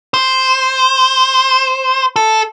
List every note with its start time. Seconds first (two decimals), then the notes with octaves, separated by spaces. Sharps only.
0.14 C5
2.16 A4